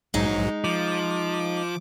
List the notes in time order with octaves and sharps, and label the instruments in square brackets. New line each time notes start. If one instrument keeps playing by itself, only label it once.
[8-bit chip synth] A#1 G#2 F#3 [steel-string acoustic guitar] G#3 D#4
[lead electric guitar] F3 [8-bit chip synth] D6